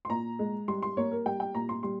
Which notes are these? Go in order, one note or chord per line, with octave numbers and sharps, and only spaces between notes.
C6
A#2 A#5
G#3
G3 C6
C6
A#3 C#5
A#4
G3 G5
G5
A#2 A#5
C6
G3 C6